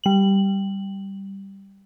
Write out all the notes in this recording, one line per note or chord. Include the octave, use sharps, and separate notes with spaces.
G3 F#7